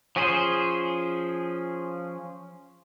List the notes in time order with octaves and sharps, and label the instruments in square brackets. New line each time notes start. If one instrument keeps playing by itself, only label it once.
[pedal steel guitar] F3 C#4 G#4 C5